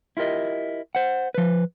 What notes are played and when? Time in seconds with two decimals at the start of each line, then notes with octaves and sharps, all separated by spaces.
0.17 E4 F4 G4 A#4 D#5
0.95 C5 F#5
1.34 F3 B4